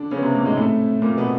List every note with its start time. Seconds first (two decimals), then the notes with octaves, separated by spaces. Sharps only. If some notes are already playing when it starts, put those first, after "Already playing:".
Already playing: D3 D4
0.11 C#3 B3 C#4
0.22 C3 C4
0.34 A#2 A#3
0.45 G#2 G#3
0.57 A2 A3 C4
1.02 A#2 A#3 C4
1.17 B2 B3